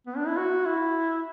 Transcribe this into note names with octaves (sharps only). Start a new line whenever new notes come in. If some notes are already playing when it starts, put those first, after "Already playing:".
B3
D4
E4
F#4
E4